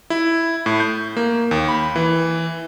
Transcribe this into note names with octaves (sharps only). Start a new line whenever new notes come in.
E4
A2
G6
A#3
D#2
B5
E3